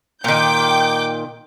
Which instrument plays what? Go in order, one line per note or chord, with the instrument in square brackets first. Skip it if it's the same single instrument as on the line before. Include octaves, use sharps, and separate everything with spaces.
[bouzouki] A#2 D#3 [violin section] G5 D6 G6